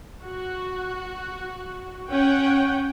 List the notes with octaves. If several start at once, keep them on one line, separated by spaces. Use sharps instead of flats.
F#4
C#4 F#5 G5